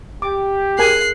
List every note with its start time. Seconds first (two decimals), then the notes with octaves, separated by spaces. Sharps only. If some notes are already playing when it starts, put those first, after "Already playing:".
0.22 G4 D6
0.79 G#4 A#4 G#5 F#6 C7